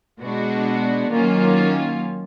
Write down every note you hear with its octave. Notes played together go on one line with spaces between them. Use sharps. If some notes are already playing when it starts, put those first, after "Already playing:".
B2 G#3 B3 D4 F#4
D#3 F#3 A#3 C#4 F4